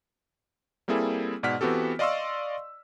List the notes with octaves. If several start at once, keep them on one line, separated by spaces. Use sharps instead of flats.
G3 A#3 C4 E4 G#4 A4
G#2 B2 D5 F#5 F6 B6
E3 B3 C4 F#4 G4 A4
D5 D#5 F5 C6 C#6 E6